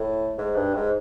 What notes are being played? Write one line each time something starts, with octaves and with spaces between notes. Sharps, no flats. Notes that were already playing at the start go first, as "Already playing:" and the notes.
Already playing: A2
G#2
G2
G#2